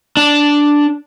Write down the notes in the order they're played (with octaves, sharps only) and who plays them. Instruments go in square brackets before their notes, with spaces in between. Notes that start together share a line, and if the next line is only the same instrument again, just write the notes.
[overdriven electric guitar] D4